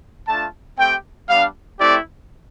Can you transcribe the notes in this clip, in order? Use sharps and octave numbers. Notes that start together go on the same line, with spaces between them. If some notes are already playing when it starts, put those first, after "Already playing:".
A3 D4 F4 A5
A3 C4 G4 G5
G3 B3 D4 F5
A3 C4 E4 G4 D5